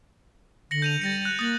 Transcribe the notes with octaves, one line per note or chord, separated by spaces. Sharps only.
D3 A#6 C#7 F#7
G6 D#7 F7
G3 A6 A#6 C#7
F#6
A#3 D#6 A6 F#7